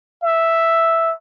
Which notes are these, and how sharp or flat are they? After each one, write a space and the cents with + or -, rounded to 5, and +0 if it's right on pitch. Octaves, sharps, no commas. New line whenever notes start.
E5 +0